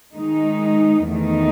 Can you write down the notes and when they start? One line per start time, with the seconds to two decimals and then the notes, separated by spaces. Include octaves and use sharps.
0.16 D#3 G#3 D#4
1.09 E2 D#3 A3 D#4